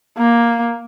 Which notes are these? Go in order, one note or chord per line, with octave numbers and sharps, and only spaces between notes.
A#3